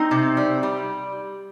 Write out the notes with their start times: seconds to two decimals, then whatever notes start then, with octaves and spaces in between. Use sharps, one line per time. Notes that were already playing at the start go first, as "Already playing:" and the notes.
Already playing: C4 D#4
0.11 C3
0.37 G3
0.63 G3